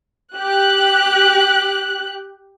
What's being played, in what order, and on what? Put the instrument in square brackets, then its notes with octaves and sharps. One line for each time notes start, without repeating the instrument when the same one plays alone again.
[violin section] G4 F#6